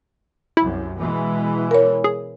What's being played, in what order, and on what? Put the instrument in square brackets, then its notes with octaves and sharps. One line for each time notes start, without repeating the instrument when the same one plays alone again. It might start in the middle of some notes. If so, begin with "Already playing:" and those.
[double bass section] C2 F#2 [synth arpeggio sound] E4
[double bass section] B2 E3 G#3
[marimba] A#4 C#5
[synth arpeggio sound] G#4